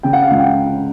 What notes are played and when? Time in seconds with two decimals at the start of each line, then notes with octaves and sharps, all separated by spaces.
0.03 C#3 G5
0.13 F#5
0.22 F5
0.30 C#2 F#5
0.39 G5
0.44 F#5